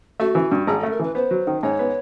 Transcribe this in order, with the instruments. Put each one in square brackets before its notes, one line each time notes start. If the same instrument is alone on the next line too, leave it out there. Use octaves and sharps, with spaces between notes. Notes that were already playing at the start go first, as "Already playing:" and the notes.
[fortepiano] A3 [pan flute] F#4
[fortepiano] E3
G2
[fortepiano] G#1 [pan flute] G#4
[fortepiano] A3 [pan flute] A4
[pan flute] A#4
[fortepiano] E3 [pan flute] B4
[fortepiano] B3 [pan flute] C5
[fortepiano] F#3
D#3
[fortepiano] G#2 [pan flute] C#5
[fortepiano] B3